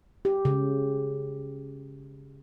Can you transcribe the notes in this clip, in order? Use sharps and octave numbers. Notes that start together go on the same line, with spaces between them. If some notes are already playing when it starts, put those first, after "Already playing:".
G4
C#3